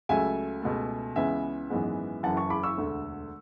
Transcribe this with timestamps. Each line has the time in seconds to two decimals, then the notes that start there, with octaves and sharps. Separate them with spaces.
0.09 C#2 C#3 F#3 A3 E5 G#5
0.62 C#2 B2 A3
1.16 C#2 C#3 E3 B3 E5 G#5
1.70 G#1 F#2 E3 G#3 B3
2.23 F#1 F#2 E3 F#5 A5
2.37 A5 C#6
2.50 B5 D6
2.63 C#6 E6
2.77 E1 D2 D3 A3